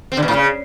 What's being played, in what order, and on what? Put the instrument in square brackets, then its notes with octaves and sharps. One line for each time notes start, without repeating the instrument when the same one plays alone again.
[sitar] C4
D3
B2
A2
C#3